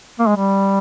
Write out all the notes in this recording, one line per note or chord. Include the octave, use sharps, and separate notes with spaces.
A#3
G#3
G3